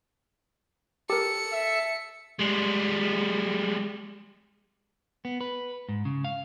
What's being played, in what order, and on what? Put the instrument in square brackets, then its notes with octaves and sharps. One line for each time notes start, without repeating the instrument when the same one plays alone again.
[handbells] G4 A#4 [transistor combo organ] A4 [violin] C#7
[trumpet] E5
[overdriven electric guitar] G3 G#3
[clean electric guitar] B3
B4
G#2
C#3
F5